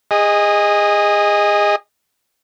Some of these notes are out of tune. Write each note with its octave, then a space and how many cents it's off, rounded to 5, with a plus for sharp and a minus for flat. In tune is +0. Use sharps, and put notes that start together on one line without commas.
G#4 -25 D#5 +0